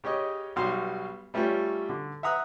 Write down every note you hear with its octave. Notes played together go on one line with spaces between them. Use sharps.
C#3 G4 C#5 D#5
B1 G3 F#4 F5 C6
G3 A3 C#4 F4 G4
D3
E5 F#5 A#5 D#6 E6 F#6